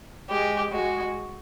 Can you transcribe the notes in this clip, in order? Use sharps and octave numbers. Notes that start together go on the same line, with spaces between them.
G#3 G4
G#3 F#4